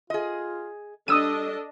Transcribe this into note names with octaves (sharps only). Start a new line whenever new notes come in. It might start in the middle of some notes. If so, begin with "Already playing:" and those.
F4 G#4 D#5
G3 D4 A4 D#5 D#6 E6 D#7